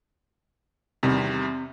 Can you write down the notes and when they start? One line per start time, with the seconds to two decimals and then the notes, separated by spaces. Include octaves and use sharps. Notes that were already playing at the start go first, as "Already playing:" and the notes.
1.03 E2 C3 D#3 G3